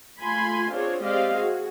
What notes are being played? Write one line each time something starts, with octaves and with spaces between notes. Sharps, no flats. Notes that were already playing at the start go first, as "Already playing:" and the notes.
A3 F4 G#5 B5 C6
C4 D4 F4 G#4 C#5
G#3 C4 G4 D5 D#5 F5
F#4 G#4